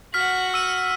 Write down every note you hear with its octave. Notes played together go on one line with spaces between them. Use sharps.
F#4 F#5 F6 B6
E6 D#7